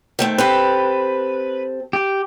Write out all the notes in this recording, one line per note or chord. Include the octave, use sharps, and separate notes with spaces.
D#3 A3 C4
C4 G4 A4 B4
G4